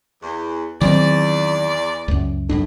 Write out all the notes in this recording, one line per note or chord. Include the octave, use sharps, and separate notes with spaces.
E2
E2 D#3 F#3 C4 D5
C#2 F#2
C2 F#2 A2 D4